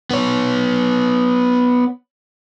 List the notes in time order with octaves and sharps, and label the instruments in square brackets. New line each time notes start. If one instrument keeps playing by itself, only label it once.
[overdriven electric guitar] B3 C#5